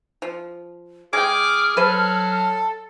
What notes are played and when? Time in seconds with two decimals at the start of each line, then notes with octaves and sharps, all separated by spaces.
0.22 F3
1.13 G#3 G#4 G5 D6 F6
1.77 F#3 A4 B4 C5 A5